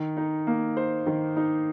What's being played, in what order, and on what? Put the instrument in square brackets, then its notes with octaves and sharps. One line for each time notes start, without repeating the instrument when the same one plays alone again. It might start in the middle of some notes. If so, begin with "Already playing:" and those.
Already playing: [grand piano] D#3
D#4
A#3
C5
D#3
D#4